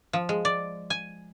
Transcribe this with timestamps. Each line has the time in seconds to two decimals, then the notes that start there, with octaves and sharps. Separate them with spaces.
0.13 F3
0.29 G#3
0.45 D5
0.90 G#5